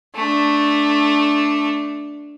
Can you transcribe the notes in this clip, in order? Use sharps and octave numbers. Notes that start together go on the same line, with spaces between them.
A3 D4